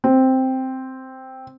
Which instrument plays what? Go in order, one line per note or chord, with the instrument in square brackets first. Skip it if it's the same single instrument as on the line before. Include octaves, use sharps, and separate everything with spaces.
[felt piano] C4